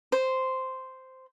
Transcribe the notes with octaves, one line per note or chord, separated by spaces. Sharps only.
C5